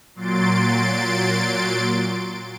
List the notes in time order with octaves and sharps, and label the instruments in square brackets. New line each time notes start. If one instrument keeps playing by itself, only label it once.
[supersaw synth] A#2 F#3 C6 A6 D7